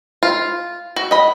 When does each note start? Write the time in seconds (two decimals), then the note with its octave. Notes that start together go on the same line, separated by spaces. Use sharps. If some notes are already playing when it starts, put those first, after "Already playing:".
0.23 F4
0.96 F#4
1.11 D#5 B5